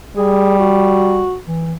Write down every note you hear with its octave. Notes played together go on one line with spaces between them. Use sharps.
G3 G#4
F#4
E3